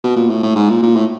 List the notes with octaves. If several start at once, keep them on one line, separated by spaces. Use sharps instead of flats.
B2
A#2
A2
A2
G#2
A#2
A#2
A2